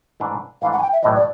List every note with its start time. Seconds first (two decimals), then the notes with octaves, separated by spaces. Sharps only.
0.20 G#2 E3 A3 D4
0.62 G#2 E3 A3 D4 F5
0.72 F#5
0.78 G#5
0.82 G5
0.93 E5
1.02 B1 A2 E3 D#5
1.15 D5